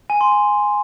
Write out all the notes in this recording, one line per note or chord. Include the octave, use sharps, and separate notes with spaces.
G#5
C6
G#5